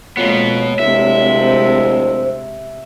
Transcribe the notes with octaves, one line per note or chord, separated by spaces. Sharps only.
F2 B2 G#3 A#3 B3 C#5
D1 C3 G#3 E5
C5